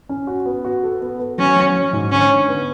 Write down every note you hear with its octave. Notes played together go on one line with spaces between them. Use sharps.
C#4
F#4
B3
F#4
A4
B3
B3
F#3 C#4
F#3
F#3
G#2
D3 C#4
D3
B3